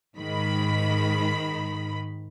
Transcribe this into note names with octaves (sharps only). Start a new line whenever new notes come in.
G#2 D#3 B5